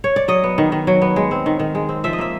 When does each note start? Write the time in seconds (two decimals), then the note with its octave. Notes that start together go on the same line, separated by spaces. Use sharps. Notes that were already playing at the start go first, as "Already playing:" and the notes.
0.04 C#5
0.16 D5
0.28 F#3 D#5
0.44 B3
0.58 D#3
0.72 D#3
0.87 F#3
1.02 B3
1.16 G#3
1.31 C4
1.46 D#3
1.59 D#3
1.75 G#3
1.89 C4
2.04 F3 E5
2.13 D#5
2.18 A#3 E5